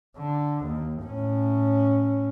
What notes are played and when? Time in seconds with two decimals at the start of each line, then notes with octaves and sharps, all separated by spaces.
0.17 D3
0.65 D#2
1.05 A2 C#4